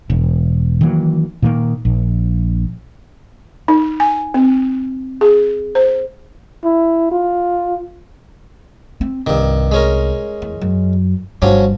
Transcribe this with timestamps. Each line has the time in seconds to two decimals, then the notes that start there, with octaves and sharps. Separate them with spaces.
0.10 E1
0.81 D#3 E3 F#3 A#3
1.42 A#2 D#3 A#3
1.85 A#1
3.68 D#4
4.00 G#5
4.34 C4
5.21 G#4
5.75 C5
6.64 E4
7.12 F4
9.01 C4
9.27 C2 G2 D#3
9.71 G#3 C#4 A#4
10.42 E2
10.62 F#2
11.42 G1 G2 F3 F#3 C#4